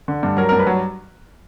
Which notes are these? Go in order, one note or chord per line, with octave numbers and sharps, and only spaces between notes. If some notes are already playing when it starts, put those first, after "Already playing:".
D3
G2
F#3 A#4
G2 A#4
B4
F#3